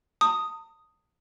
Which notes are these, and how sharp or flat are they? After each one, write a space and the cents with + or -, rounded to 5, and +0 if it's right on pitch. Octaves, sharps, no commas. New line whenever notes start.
A5 +45 D#6 +0